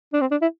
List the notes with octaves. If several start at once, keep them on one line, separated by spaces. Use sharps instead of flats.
D4
C4
D4
E4